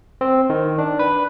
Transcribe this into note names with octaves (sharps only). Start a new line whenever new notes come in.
C4
D#3
D4
B4